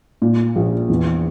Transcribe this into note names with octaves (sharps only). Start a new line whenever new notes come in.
A#2
A#1
E2